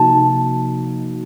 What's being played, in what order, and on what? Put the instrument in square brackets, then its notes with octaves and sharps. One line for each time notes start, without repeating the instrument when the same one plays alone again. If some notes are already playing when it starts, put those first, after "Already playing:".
Already playing: [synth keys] C3 F3 A#3 D#4 F#4 [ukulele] A5